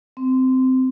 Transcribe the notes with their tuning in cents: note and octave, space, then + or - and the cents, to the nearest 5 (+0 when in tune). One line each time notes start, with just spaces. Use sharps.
C4 -15